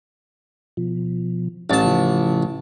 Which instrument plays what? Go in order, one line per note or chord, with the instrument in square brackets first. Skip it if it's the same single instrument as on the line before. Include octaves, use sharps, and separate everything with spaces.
[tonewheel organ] B2 F3
[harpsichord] A1 A5 [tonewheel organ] A6
[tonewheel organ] C#3 F3